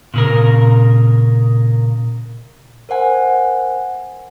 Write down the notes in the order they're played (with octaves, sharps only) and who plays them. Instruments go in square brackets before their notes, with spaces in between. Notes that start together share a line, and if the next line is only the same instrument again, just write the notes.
[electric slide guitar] A#2 C#3 A#4
[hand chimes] A#4 C5 F#5 G#5